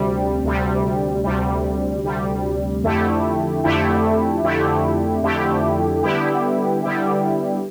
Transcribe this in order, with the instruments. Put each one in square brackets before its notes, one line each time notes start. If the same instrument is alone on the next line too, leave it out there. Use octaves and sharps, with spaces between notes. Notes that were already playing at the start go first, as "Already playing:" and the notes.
Already playing: [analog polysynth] D2 C3 G3
D2 C3 G3
D2 C3 G3
D2 C3 G3
F2 D3 A3 E4 G4
F2 D3 A3 E4 G4
F2 D3 A3 E4 G4
F2 D3 A3 E4 G4
D3 G3 B3 E4 G4
D3 G3 B3 E4 G4